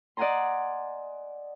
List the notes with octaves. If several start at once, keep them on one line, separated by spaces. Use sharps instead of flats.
D5 D#5 F#5 G#5 A#5 C6